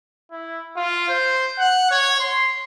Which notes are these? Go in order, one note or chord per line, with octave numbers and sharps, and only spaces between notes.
E4
F4
C5
F#5
C#5
C6